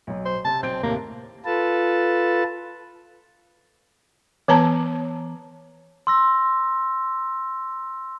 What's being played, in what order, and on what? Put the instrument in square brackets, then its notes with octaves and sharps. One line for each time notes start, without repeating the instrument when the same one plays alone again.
[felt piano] B1 F#3
[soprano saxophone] C5
[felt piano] C3 C4 [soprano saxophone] A5
[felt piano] B1 G6 D7 [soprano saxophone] C4
[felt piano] D#2 A2 C3 [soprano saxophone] A#3
[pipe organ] F4 A4 B4 A5
[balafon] E3 B3 B4 A5 A#5
[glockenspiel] C6 E6 A#6